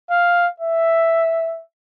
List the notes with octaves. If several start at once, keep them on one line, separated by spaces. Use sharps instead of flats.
F5
E5